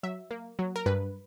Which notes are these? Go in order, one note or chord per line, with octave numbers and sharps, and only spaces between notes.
F#3 E5
A#3
F#3
A#4
G2 B4